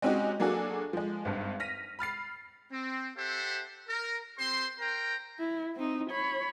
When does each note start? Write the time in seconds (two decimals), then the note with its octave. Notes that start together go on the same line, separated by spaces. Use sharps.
0.02 G#3 C4 C#4 D#4 F#4 G4
0.40 F#3 A#3 D4 F#4 G#4 A4
0.93 F3 G#3
1.25 G#1 G2
1.60 F6 A#6 B6 D#7
1.99 B5 F6 A6 C7
2.72 C4
3.17 G4 A4 C5 E5 F#5
3.88 A#4
4.39 C4 G4 C5 C6
4.79 A#4 C5 G5 A#5
5.39 E4
5.75 C4 D#4
6.11 C#5 B5